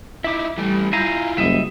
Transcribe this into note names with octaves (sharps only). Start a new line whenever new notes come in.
D#4 E4 E5 D6
E3 G3 A3
E4 F4 F5 G#5 A#5 G6
F#1 G3 D#5 E5